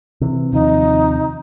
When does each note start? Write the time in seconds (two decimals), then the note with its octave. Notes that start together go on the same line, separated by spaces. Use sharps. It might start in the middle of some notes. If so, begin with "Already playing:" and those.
0.21 C3 E3
0.53 D#2 C3 F3 D#4